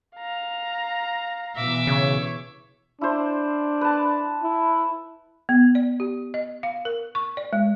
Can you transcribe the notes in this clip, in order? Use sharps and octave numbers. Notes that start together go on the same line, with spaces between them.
F5 A#5
B2 E3 E5 D6
C#3 C#5
D4 E4 C5
B4 A5
E4
B3
D5
G4
D#5
F5
A#4
C#6
D5
G#3